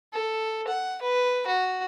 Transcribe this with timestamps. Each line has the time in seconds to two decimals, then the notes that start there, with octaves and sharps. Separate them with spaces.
0.13 A4
0.68 F#5
1.02 B4
1.47 F#4